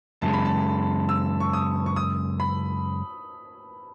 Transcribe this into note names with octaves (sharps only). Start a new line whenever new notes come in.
F#2 C#3 G#3 A5
B5
A5
E6
C#6
D#6
C#6
D#6
B5